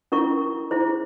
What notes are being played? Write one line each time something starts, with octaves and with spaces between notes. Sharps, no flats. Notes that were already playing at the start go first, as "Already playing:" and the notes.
C#4 E4 A#4 C#6
E4 G#4 C5